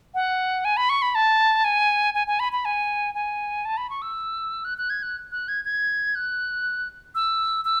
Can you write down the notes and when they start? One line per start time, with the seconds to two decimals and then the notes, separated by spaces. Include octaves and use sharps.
0.14 F#5
0.65 G#5
0.77 B5
0.89 C#6
1.02 B5
1.15 A5
1.64 G#5
2.14 G#5
2.27 G#5
2.40 B5
2.52 B5
2.65 G#5
3.15 G#5
3.65 A5
3.77 B5
3.90 C#6
4.02 E6
4.65 F#6
4.78 F#6
4.90 G#6
5.03 F#6
5.31 F#6
5.48 G#6
5.65 G#6
6.15 F#6
7.15 E6
7.65 E6